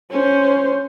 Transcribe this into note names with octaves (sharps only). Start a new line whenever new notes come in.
C#4 C5